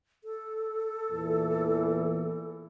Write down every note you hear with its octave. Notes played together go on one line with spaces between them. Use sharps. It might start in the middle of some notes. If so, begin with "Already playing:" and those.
A4
E2 A#2 E3